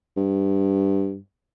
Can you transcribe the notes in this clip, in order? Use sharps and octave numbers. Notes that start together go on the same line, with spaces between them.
G2